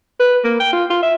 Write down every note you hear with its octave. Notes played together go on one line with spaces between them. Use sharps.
B4
A#3
G5
F4
F4
E5